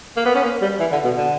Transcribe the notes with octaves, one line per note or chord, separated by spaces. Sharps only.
A#3
B3
C#4
A#3
G3
E3
D3
B2
D3